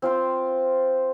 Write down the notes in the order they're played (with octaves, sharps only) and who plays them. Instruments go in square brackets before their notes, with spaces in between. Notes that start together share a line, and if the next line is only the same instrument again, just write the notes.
[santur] C4 F4 C5